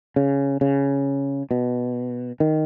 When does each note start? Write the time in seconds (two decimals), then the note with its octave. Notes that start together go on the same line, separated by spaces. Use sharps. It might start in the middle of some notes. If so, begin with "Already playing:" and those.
0.16 C#3
0.61 C#3
1.51 B2
2.40 D#3